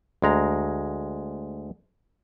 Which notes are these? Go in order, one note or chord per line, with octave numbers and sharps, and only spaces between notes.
D2 G#3 A#5